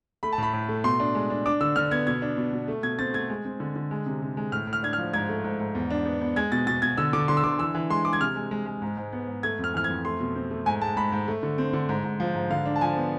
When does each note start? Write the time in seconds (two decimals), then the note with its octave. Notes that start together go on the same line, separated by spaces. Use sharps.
0.23 A3 B5
0.33 A5
0.38 A2 B5
0.53 A2
0.69 A3
0.84 B2 C6
1.00 D4
1.15 G#3
1.30 D4
1.46 D4 D6
1.61 D3 E6
1.76 D3 F6
1.91 B3 G#6
2.07 B2 G#6
2.22 D4
2.37 B2
2.53 B2
2.68 A3
2.83 B2 G#6
2.99 C4 A6
3.14 A3 G#6
3.30 G#3
3.45 C4
3.60 D3
3.76 D3
3.91 G#3
4.06 C3
4.22 C3
4.37 G#3
4.52 A2 F6
4.67 A2
4.73 F6
4.83 D4 G#6
4.93 F6
4.98 F3
5.13 G#2 G#6
5.29 A3
5.44 G#2
5.60 G#2
5.75 E2
5.90 D4
6.06 B3
6.21 B3
6.36 G#3 G#6
6.52 B2 A6
6.67 B2 A6
6.82 B2 G#6
6.98 D3 E6
7.13 D3 D6
7.28 D3 C6
7.37 E6
7.43 D3 D6
7.59 E3 E6
7.75 E3
7.90 G#3 C6
8.05 G#3 D6
8.13 G#6
8.20 C3 F6
8.36 G#3
8.51 G#3
8.66 G#3
8.82 G#2
8.97 G#2
9.12 B3
9.28 G#2
9.43 A3 G#6
9.59 F2
9.64 F6
9.74 E3 F6
9.84 G#6
9.89 F2
10.05 A3 C6
10.20 B2
10.35 C4
10.51 A3
10.66 G#2 G#5
10.81 G#3 A5
10.97 G#2 B5
11.12 G#2
11.28 A3
11.43 D3
11.58 C4
11.73 D3
11.89 G#2
12.04 G#2
12.20 F3
12.35 G#2
12.50 D3 F5
12.66 D4
12.76 A5
12.81 F3 G#5
12.96 B3